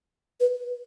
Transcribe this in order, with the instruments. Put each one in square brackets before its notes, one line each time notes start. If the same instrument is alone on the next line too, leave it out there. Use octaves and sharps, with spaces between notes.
[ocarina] B4